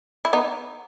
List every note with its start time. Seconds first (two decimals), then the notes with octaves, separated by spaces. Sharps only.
0.25 E4
0.33 B3 D#4